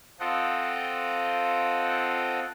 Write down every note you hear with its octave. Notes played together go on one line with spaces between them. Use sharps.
C4 F4 A4 D#5 F#5 G5